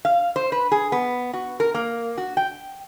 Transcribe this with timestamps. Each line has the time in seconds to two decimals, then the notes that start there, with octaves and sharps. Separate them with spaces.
0.05 F5
0.36 C5
0.52 B4
0.72 G#4
0.92 B3
1.33 F#4
1.60 A#4
1.74 A#3
2.18 F#4
2.37 G5